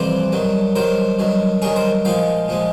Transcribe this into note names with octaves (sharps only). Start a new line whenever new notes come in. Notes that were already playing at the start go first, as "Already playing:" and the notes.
Already playing: F2 C3 E3 G3 C5 D5
G2 D#3 F#3
G2 D#3 F#3 A#4 C5
G2 D#3 F#3
G2 D#3 F#3 G#4 A#4
A#4 C5
A#2 F3 G#3 F5 G5
A#2 F3 G#3